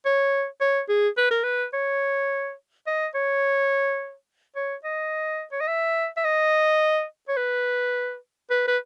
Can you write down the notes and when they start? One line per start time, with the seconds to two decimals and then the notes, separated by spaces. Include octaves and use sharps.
0.05 C#5
0.61 C#5
0.89 G#4
1.17 B4
1.31 A#4
1.44 B4
1.73 C#5
2.87 D#5
3.15 C#5
4.56 C#5
4.84 D#5
5.52 C#5
5.61 D#5
5.67 E5
6.17 E5
6.24 D#5
7.28 C#5
7.37 B4
8.50 B4
8.68 B4